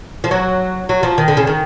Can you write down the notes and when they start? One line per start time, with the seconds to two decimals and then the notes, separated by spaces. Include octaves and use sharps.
0.24 F3
0.31 F#3
0.89 F#3
1.03 F3
1.18 D#3
1.28 D3
1.37 C#3
1.47 D#3